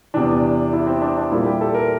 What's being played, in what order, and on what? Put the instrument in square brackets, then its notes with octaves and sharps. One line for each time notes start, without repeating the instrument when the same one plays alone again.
[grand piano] E2 C3 E3 D4
E4
C4
D4
D4
A#2 G3 A#3 E4
G4
A4
A#4